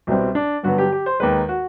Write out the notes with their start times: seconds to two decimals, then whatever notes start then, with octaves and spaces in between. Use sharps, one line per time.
0.07 C2 B2 G3 C4
0.35 D4
0.63 G2 D3 F#3 B3 F#4
0.78 G4
0.92 G4
1.06 C5
1.20 D#2 D#3 G#3 B4
1.49 F#4